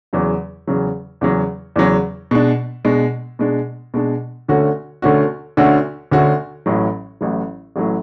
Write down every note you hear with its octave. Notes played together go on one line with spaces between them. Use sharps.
E2 C#3 F#3
E2 C#3 F#3
E2 C#3 F#3
E2 C#3 F#3
B2 G#3 D4
B2 G#3 D4
B2 G#3 D4
B2 G#3 D4
D2 D3 A3 C#4 F#4
D2 D3 A3 C#4 F#4
D2 D3 A3 C#4 F#4
D2 D3 A3 C#4 F#4
A1 A2 F#3
A1 A2 F#3
A1 A2 F#3